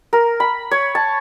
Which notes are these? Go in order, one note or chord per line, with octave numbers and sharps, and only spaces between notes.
A#4
B5
C#5
A5